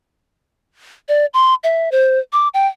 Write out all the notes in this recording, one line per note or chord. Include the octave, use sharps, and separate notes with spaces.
D5
C6
E5
C5
D6
G5